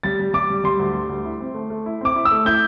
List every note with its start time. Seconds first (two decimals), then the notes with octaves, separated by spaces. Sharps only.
0.03 G3 A6
0.19 G3
0.33 G3 D6
0.50 G3
0.64 G3 C6
0.79 D2
0.94 G3
1.09 D2
1.24 E4
1.40 C4
1.54 A3
1.70 A3
1.86 E4
2.01 C4 D6
2.15 E4
2.25 E6
2.31 A3
2.46 E4 G6